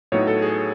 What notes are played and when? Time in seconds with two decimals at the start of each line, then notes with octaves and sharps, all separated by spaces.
0.12 A2 F#3 B3 D#4 C#5
0.27 A4
0.42 G#4